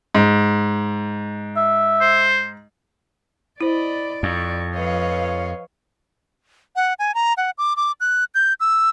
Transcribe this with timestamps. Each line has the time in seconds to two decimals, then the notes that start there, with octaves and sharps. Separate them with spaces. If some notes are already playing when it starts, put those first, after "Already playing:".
0.15 G#2
1.57 E5
2.01 C5
3.61 E4 C5 D5 D#5 B5
4.23 F2 C#6
4.73 F3 B4 C#5 D#5 F5
6.76 F#5
6.99 G#5
7.15 A#5
7.37 F#5
7.58 D6
7.77 D6
8.01 F#6
8.35 G6
8.60 E6